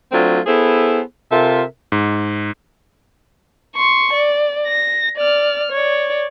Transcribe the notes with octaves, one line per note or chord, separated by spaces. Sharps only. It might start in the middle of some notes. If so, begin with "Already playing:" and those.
F#3 A3 C4 D4 F4
B3 E4 G#4 A4 C5
C3 F4 A4 A#4 E5
G#2
C6 C#6
D5
A#6
D5 F6
C#5 D5